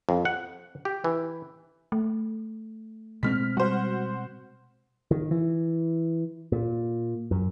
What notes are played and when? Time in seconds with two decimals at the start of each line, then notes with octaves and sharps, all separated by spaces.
0.09 F2
0.25 F#5
0.85 G4
1.04 E3
1.92 A3
3.23 B2 G#3 C4 F6 B6
3.57 G3 F#4 C5
5.11 D#3
5.31 E3
6.52 A#2
7.31 F#2